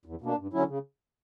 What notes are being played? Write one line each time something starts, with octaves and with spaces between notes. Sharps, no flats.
E2
B2 A#3 D4
G2
D3 F#3 C#4 E4
C#3